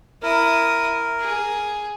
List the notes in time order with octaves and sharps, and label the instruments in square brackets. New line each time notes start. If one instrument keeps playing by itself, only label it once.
[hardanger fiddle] E4 D#6 [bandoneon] A#4
[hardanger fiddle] G#4